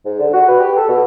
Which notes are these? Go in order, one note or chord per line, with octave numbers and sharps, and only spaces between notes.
G#2
D3
F#4
B4
G4
A4
B2